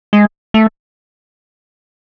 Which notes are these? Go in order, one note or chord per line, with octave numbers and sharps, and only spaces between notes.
G#3
A3